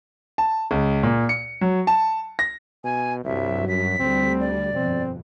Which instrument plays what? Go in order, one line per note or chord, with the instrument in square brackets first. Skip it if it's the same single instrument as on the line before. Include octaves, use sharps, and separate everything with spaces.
[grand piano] A5
C#2
A#2
C#7
F#3
A5
A#6
[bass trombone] B2 [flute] G#5
[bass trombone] C2 [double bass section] G2 F#3 [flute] E5
[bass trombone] F#2 [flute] B6
[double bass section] D2 G3 [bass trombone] C4
[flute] D5
[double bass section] G1 F2 B2 [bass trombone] C4